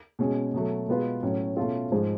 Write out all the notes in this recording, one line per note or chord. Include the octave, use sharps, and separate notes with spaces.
B2 G#3 C#4 G#4
B2 F#3 A3
B2 G#3 B3 F4 B4
A2 F#3 C#4
B2 A3 C#4 F4
G#2 F3 G#3